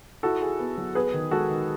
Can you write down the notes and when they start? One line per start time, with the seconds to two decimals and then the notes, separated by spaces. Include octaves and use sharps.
0.23 E4 F#4 A4
0.41 G#4
0.59 B3
0.77 F#3
0.95 B3 G#4 B4
1.13 D#3
1.31 G#3 F#4 A4
1.49 D#3